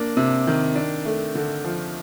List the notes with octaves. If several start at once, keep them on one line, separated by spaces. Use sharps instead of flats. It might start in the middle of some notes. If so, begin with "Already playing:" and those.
Already playing: A#3 D4
C3
D#3
D4
A3
D3
F3